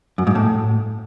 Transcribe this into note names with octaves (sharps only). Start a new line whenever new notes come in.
F#2
G#2
A2